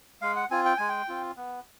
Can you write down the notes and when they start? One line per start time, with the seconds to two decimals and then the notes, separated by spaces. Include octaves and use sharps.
0.22 G#3 F5
0.36 F#5
0.50 C4 F4 G#5
0.65 G5
0.77 G#3 G#5
0.89 G5
1.08 C4 F4
1.37 B3